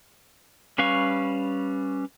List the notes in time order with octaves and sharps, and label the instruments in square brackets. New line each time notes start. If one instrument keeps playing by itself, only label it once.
[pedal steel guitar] G3 C#4 B4 F5 C#6